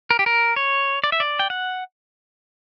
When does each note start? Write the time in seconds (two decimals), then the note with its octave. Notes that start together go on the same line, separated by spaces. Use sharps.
0.11 A#4
0.19 G4
0.26 A#4
0.56 C#5
1.04 D5
1.12 E5
1.20 D5
1.39 G5
1.50 F#5